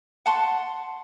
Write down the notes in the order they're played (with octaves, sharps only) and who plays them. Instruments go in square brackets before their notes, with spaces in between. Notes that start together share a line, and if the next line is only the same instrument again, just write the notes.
[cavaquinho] F#5 A5 C6 C#6